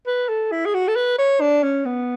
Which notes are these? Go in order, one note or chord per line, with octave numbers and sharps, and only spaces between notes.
B4
A4
E4
G#4
F#4
A4
B4
C#5
D4
C#4
B3